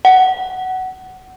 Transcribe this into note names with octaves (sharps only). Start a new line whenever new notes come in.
F#5